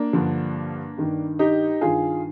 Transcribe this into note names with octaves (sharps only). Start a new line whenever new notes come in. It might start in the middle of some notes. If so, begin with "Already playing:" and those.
Already playing: A#3 D4
G2 D3 F3
G2 D#3
D#4 G4
G2 D#3 F4 G#4